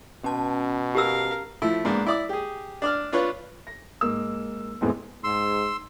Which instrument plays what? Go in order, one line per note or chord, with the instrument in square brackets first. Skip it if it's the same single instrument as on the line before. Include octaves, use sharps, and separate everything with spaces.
[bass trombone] B2 [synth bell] C#4 A5
[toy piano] G4 E6 [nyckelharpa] A#4 F5
[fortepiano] F3 A3 E4
G#2 A#3 B3 D4
E4 D5 D6
G4 G#4
D4 D5 F6
D4 F4 B4 C#5
[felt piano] A#6
G#2 A#3 E6
E2 A2 G#3 B3 C4
[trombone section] G#2 [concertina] C6 E6